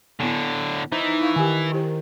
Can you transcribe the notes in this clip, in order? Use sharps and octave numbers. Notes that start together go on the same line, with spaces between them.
A2 D3 B3 E4
E3 D#4 E4 C5
E4 F5 C#6
D#3 G4 G#5
E4 G4 C5